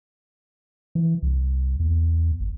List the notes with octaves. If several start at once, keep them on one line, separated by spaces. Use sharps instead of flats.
E3
C2
E2
G#1